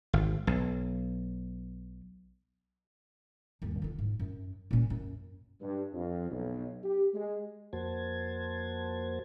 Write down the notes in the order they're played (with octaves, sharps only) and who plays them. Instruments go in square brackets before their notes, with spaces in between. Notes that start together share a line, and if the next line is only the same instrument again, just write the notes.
[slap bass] G#1
B1
[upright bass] G1 D#2
D3 F4
G#2
F#2
A#2 C#4
F#2
[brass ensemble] G2
F2
B1
G4
G#3
[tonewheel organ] F2 A#3 F#4 C5 A5 G#6